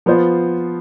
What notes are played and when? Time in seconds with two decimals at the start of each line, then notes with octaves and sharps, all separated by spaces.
0.06 F3 B3 F4 C5